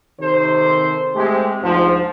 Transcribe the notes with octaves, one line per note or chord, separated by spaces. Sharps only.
C3 D#3 A4 C5
G#3 A3 C4 G4
D2 G#2 F3